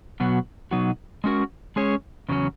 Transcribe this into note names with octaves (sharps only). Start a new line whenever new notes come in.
B2 F#3 B3 F#4
B2 F#3 B3 D#4 F#4
G#3 C#4 F#4 A#4
G#3 C#4 G#4 C#5
E2 C#3 F#3 C#4